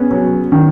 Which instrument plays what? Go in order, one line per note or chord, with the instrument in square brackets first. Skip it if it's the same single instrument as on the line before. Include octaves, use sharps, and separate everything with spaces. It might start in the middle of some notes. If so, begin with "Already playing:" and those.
Already playing: [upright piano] B3 C#4 [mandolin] G#4
[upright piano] F#3
D#3